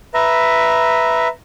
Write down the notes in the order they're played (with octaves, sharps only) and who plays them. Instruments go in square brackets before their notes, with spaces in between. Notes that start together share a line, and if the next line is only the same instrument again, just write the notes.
[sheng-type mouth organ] B4 E5 A#5